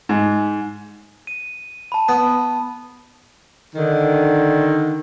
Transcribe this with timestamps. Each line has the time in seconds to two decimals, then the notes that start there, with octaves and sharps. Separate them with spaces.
0.09 G#2
1.27 D#7
1.92 A5 B5
2.09 B3
3.75 D3 D#3